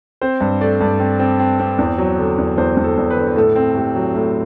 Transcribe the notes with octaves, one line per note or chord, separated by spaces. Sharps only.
C4 C5
G2
A3 D5
G2
C4
C4
C4
C4
E2
F#3
D3
E2
E2 C5
E2
A4
E2
B4
D3
A2 A4
C4
A2 G4
F#3
A2